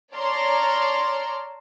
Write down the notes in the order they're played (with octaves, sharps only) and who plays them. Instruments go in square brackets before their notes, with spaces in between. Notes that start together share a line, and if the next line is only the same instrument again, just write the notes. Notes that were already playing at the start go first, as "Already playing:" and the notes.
[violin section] C#5 D5 A5 A#5 C6 F6